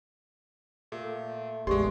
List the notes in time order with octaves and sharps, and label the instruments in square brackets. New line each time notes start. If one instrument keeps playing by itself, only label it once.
[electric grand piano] A#2 [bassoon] A3 [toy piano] A4
[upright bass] A1 E2 [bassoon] G2 [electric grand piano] G#3 C6 [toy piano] G4 C#6 D#6